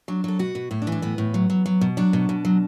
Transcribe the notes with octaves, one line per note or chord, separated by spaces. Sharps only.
F#3 D4
F#3 A4
B2 F#4
B2
A2 E4
D4
E3
D4
A2 B3
A2
F#3
F#3
F#3
B2
F#3 D4
B2
B2
F#3